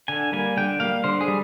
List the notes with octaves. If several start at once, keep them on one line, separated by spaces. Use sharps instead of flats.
D3 G#5
G3 A#3 G#5
D3 G5
G3 A#3 F5
D3 C5
G#4
G3